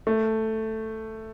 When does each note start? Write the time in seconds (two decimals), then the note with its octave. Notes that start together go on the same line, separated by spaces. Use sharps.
0.07 A3